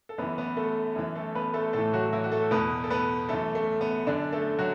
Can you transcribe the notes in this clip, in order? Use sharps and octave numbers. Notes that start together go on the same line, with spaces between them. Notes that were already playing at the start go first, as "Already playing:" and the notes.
A4
F#2 E3 B3 B4
B3 B4
A3 A4
F#2 E3
A3 A4
B3 B4
A3 A4
A2 E3 A3 A4
F#3 F#4
E3 E4
F#4
A3 A4
E2 B2 B3 B4
A4
B3 B4
F#2 E3 A3 A4
A3
B3
F#2 D3 D4
A3 A4
F#3 F#4